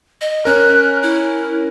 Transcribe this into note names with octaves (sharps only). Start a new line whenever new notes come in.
D#5
C#4 A#4 F#6
E4